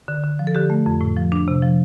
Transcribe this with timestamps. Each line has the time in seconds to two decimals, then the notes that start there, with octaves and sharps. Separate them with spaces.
0.08 D3
0.24 D3
0.39 F3
0.47 A4
0.55 D3 G4
0.70 A3
0.86 F2
1.01 A2
1.16 F3
1.32 D4
1.48 C3
1.62 F3